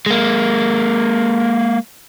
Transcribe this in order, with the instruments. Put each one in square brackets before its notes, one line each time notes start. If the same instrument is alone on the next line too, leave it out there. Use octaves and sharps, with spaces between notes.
[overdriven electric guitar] G#3 A#3